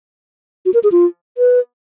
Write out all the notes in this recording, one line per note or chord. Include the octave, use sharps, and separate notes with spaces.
F#4
A#4
G#4
F4
B4